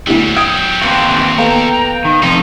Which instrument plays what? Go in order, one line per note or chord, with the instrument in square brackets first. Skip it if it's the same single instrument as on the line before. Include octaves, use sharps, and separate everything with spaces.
[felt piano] D2 E4 G4 [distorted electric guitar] F#3 G3
[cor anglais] G5 [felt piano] D#6 G#6 D7
[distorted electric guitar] D#2 [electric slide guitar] A#3 C4 F#4 [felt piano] C#7
[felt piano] B3 A4 F5 [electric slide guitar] A#5
[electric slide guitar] D#3
[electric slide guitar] F2 C3 F3 [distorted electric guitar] D#4